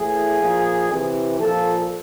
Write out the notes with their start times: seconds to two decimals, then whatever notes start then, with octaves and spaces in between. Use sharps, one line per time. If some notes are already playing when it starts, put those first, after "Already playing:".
Already playing: A2 E3 G#4
0.42 A#2 F3
0.91 C3 E3
1.40 A#2 F3 A4